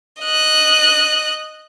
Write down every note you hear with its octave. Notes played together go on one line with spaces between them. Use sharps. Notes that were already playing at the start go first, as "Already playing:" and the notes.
D#5 F#6